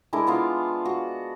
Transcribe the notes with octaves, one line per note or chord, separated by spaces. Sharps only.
G#3 D4 E4 A#4
B3 F4 F5
F#4